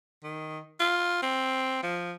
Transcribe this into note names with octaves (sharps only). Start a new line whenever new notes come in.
D#3
F4
C4
F3